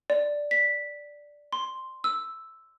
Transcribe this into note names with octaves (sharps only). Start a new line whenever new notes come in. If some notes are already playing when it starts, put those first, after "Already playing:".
D5
B6
C6
E6